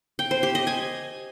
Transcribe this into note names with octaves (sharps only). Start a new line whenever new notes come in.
G5
C5
G4
D#5
G#5